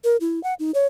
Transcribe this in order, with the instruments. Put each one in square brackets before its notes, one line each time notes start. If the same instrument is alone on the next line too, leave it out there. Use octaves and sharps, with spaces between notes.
[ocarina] A#4
E4
F#5
D#4
C#5